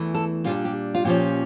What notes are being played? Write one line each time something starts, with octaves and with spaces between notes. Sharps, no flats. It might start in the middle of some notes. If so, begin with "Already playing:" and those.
Already playing: E2 E3 A3
A4
A#2 G3 D4 F4
G4
F4
A#2 F3 C#4 G4